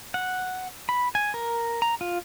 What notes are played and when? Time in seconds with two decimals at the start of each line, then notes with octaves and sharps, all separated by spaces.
0.14 F#5
0.89 B5
1.15 G#5
1.34 A#4
1.82 A#5
2.01 F4